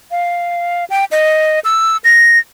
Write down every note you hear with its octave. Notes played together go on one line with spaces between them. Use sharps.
F5
G5
D#5
E6
A#6